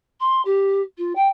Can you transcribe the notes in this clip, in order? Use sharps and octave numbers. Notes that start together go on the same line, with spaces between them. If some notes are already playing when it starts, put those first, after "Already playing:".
C6
G4
F4
G5